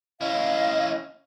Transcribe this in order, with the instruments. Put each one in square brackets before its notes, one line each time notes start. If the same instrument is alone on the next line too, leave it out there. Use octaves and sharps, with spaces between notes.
[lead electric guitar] C#4 E4 [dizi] D#5 [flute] F5